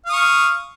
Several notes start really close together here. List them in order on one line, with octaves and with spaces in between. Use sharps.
F5 D#6 C#6